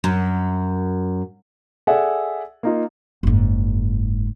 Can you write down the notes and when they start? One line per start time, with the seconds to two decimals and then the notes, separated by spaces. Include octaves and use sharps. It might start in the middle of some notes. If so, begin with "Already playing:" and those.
0.04 F#2
1.87 G#4 A4 D5 E5 F#5 G#5
2.63 A#3 D#4 F4
3.23 F#1 G#2